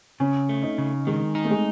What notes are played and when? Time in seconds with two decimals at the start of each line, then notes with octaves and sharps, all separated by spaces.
0.20 C#3 C#4
0.49 A3
0.63 D#4
0.78 C#3
1.07 D#3 G#3
1.35 D#4
1.45 A3
1.51 G#3